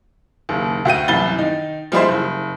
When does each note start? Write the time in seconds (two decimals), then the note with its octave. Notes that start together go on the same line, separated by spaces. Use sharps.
0.49 F#1 D#2
0.85 D2 F#4 G5 D#7
1.08 C2 F#2 E3 B5 A6 G7
1.38 D#3 D#4
1.92 F3 G3 D#4 E4 G#4 C5
2.09 F#1